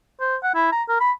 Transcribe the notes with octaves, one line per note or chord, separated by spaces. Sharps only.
C5
F#5
E4
A#5
A#4
B5